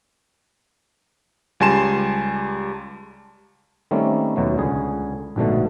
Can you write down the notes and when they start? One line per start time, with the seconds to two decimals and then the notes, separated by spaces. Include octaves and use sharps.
1.60 C#2 G3 G#5 A5 C6 E7
3.91 D#3 G3 A3 A#3 C4 C#4
4.36 D#2 B2 F#3 A3
4.58 C#2 D3 G#4
5.36 A#1 G#2 B2 D3 A3